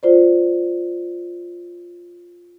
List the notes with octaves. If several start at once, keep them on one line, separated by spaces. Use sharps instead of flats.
F4 C5 D5